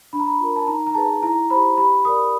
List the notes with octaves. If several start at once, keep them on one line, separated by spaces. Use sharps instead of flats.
D4 B5
A#5
B5
F4 A#4
A5
D#4 A#5
A#5
G#4 B4 A5
E4 A#5
G4 C5 B5
G4 B5
A#4 D5 D#6